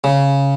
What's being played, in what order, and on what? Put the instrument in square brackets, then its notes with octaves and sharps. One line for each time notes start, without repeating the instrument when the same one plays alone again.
[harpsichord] C#3